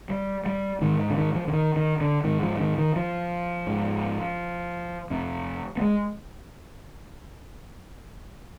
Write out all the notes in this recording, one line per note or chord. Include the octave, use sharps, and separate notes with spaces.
G3
G3
G#2 D#3
D3
D#3
F3
D3
D#3
D#3
D3
G#2 D#3
F3
D#3
D#3
F3
G#2
F2 C3
B3
G#3